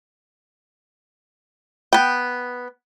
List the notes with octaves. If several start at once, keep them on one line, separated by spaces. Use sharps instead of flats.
B3 G5